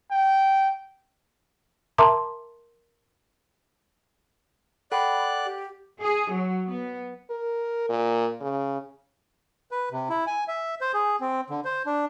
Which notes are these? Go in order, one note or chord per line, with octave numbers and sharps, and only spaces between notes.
G5
A#4 E5 A5 A#5 C6 D6
A4 D5 F#5 G5 B5 F#6
G4
G#4
F#3
B3
A#4
A#2
C#3
B4
C3
E4
G#5
E5
C5
G#4
C4
D3
C5
D4